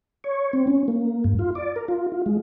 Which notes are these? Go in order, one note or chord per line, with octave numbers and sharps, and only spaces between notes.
C#5
C4
C#4
A#3
G2
F4
D5
A#4
F4
F4
G#3